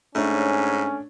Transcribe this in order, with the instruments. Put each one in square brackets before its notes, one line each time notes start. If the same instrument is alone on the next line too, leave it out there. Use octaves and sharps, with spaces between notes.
[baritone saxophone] G#2 [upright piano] A3 D4 C#5 [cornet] C#4